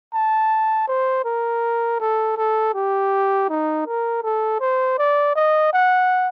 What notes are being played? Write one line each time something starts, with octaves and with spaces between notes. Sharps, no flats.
A5
C5
A#4
A4
A4
G4
D#4
A#4
A4
C5
D5
D#5
F#5